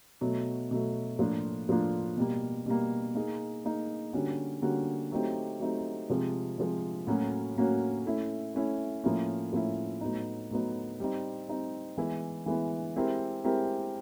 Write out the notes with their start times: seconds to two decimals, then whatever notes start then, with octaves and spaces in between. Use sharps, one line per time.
0.21 B2 F#3 A3
0.71 B2 F#3 A3
1.19 A2 F3 A#3 D4 F4
1.69 A2 F3 A#3 D4 F4
2.17 B2 G3 A#3
2.66 B2 G3 A#3
3.15 A#3 D#4 G#4
3.65 A#3 D#4 G#4
4.13 D3 G3 A#3 C#4 F#4
4.62 D3 G3 A#3 C#4 F#4
5.11 F#3 A3 C4 D#4 G4
5.60 F#3 A3 C4 D#4 G4
6.09 C3 F3 G#3
6.58 C3 F3 G#3
7.07 A2 F#3 A#3 C#4 F#4
7.56 A2 F#3 A#3 C#4 F#4
8.06 A3 C#4 E4
8.54 A3 C#4 E4
9.04 A2 F3 A#3 C#4 E4
9.53 A2 F3 A#3 C#4 E4
10.01 A2 F#3 B3 D#4
10.51 A2 F#3 B3 D#4
11.00 G3 C4 D#4
11.49 G3 C4 D#4
11.97 E3 G#3 B3 E4
12.46 E3 G#3 B3 E4
12.96 G#3 C4 E4 G4 A#4
13.44 G#3 C4 E4 G4 A#4